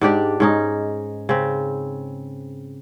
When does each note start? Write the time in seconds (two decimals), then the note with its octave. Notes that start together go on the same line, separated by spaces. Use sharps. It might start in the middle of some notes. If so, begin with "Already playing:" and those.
0.01 G#2 D4 G4 D5
0.40 G#2 C#4 D#4
1.29 C#3 C4